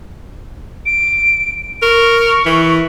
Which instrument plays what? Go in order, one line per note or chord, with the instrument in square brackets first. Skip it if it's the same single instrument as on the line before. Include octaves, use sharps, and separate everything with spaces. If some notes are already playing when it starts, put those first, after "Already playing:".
[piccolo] D7
[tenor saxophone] A#4 [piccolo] C#6
[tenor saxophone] E3